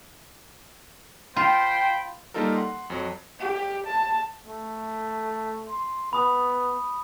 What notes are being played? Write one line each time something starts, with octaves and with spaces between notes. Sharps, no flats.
F4 C5 G5 B5
G3 A#3 D#4 F4 A4 A#4
F#5 C6
F2 F#3
G4
A5
A3
C6
B3 B5 D#6